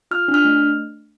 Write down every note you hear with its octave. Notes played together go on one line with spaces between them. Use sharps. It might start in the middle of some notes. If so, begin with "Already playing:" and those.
F4 F6
D4
F6
A3